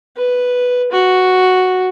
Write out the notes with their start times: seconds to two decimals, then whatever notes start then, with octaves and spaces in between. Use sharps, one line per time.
0.16 B4
0.91 F#4